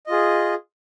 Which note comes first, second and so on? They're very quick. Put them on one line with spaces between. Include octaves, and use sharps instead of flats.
D#5 F4 G#4